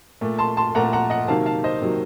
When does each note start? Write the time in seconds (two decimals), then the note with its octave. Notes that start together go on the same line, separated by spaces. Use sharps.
0.21 A#2 A3
0.39 A5 C6
0.57 A5 C6
0.75 A#2 A3 F#5 A#5
0.93 F#5 A#5
1.10 D#5 F#5
1.28 C3 D#3 F#3 A#3 F5 A5
1.46 F5 A5
1.64 C5 D#5
1.82 C3 D#3 F#3 A#3